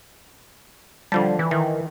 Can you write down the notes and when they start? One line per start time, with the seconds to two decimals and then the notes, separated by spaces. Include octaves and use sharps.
1.12 D3 F3 G3 A5
1.39 E3
1.51 D#3 E3